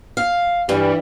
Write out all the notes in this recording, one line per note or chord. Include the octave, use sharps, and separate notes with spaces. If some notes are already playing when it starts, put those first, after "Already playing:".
F5
G2 E3 G3